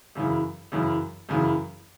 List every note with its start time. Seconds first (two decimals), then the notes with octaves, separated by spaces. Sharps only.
0.15 F#2 C#3 E3
0.72 F#2 C#3 E3
1.29 F#2 C#3 E3